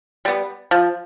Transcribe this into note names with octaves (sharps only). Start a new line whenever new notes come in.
G3 B3
F3